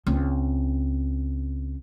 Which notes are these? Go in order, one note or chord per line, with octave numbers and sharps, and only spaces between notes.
C#2 C4